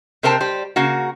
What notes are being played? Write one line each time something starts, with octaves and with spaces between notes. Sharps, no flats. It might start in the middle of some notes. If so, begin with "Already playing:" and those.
C3 C4 A#4 C5 G5 A5
G3 G4 C5
C#3 A#3 F#4